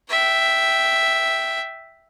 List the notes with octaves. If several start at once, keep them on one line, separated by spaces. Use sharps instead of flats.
E5 G5